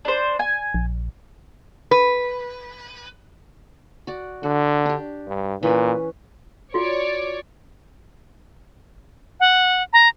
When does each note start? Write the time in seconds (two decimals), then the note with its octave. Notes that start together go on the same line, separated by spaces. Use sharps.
0.05 D4 C5
0.39 G#5
0.74 A#1
1.91 B4
4.07 F#4 D5
4.43 D3 F#4
4.86 D4 G4
5.27 G2
5.63 A#2 E3 C#4 B4
6.74 F4 F#4 C#5 D5
9.40 F#5
9.93 A#5